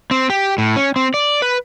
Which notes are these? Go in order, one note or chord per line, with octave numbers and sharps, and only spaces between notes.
C4
G4
A2
C#4
C4
D5
B4